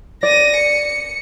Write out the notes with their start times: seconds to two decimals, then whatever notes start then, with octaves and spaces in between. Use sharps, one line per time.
0.23 D5 A#6 D#7
0.56 C#7